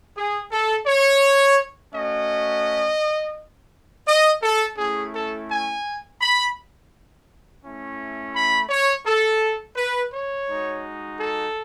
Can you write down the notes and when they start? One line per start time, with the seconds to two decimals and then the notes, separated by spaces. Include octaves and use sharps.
0.16 G#4
0.52 A4
0.86 C#5
1.93 A3 C#4 F#4 D#5
4.06 D#5
4.42 A4
4.78 A3 C#4 E4 G#4
5.13 A4
5.50 G#5
6.21 B5
7.63 A3 C#4 E4
8.34 B5
8.69 C#5
9.06 A4
9.76 B4
10.11 C#5
10.47 G#3 D#4 F#4
11.19 A4